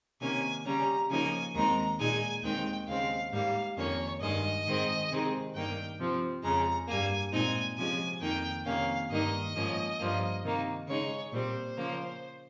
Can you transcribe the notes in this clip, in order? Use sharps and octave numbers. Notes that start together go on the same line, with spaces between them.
C3 D#3 A#3 C#4 G#5
C#3 G3 C#4 A#5
C#3 F3 A#3 D#4 G#5
D#2 D#3 G#3 C4 D#4 A#5
A#2 G#3 D#4 G#5
D#2 D#3 G#3 C4 D#4 G5
D#2 C#3 G#3 C4 F5
G#2 G3 A#3 F5
F2 D#3 A#3 C#4 C#5
G2 D#3 G#3 D#5
G#2 D#3 G#3 C4
C3 D#3 G#3 C4 D#4
G2 D#3 A#3 D#4 G5
C3 F3 C4
F2 C#3 G#3 A#5
G2 G3 A#3 G#5
A#2 G#3 C4 D#4 G#5
C3 F3 G#3 C#4 G#5
F2 D#3 A#3 D#4 G5
F2 C3 D#3 A#3 C#4 F5
G2 D#3 A#3 D#4 D#5
G#2 F3 A#3 C#4
G2 F3 A#3
C3 D#3 A#3 D#4
C#3 G#3 D#4 C#5
A#2 G3 C4 C5
C#3 F3 A#3